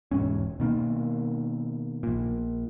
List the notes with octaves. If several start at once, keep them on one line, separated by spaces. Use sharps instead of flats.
E1 G#2 C#4
B2 D#3 A#3
A#1 A#2